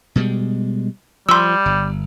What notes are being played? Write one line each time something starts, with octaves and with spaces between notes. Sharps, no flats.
B2 G3 G#3
F3 G3 C6 E6
G1